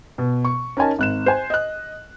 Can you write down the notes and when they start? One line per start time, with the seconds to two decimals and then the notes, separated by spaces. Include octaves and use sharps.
0.18 B2
0.45 C#6
0.77 C#4 D#4 A#4 G#5 A5
0.99 G#1 F#6 E7
1.26 C5 G#5
1.50 D#5 F#6